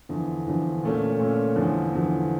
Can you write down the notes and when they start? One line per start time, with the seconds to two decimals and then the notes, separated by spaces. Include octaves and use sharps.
0.09 E2 D3 F3
0.47 E2 D3 F3
0.83 A#2 A3 C#4
1.19 A#2 A3 C#4
1.56 E2 D3 F3
1.93 E2 D3 F3